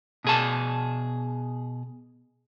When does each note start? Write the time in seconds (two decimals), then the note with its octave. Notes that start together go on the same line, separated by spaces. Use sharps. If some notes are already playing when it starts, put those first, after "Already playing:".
0.24 B2 G#4 A5